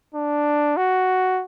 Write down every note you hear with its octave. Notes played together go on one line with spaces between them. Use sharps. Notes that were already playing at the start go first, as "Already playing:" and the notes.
D4
F#4